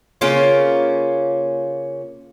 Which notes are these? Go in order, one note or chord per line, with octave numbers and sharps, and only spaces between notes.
C#3 A#3 C#4 F4